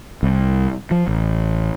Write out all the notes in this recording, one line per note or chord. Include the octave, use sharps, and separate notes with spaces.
C2
F3
A1